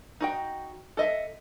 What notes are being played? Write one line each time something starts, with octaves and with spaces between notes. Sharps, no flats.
D#4 F#4 G5
A4 D#5 E5